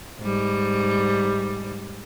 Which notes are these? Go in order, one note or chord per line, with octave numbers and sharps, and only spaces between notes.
G#2 G3